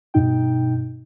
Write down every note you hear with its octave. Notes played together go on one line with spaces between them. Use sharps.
G2 B2 D#4 G5